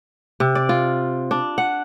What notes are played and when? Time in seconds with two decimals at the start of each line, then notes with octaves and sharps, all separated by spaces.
0.40 C3
0.55 D5
0.69 F4
1.31 D4
1.58 F#5